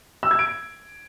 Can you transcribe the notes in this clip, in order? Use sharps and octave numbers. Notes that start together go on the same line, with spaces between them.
E6
G#6
D7